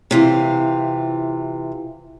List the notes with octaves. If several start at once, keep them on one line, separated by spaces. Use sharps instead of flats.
C3 E3 F4